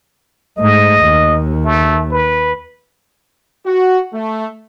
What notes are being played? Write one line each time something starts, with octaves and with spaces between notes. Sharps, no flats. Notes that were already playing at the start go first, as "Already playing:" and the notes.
G#2 A3 D#5
D#2
A3
B4
F#4
A3